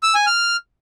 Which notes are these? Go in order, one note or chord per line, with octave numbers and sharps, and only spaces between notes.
E6
G#5
F6